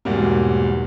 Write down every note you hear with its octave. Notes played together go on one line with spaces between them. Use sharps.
B1 E2 G#2 F#3 G3 A#3